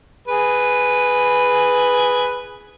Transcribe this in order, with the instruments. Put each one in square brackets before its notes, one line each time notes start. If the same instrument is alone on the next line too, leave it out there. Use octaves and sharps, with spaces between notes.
[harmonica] G#4 B4